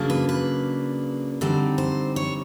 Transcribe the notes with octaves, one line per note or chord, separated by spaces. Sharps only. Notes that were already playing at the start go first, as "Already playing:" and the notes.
Already playing: C#3 F#3 A#3 D4
B4
B4
D3 G3 C4 D#4 C5
C5
C#5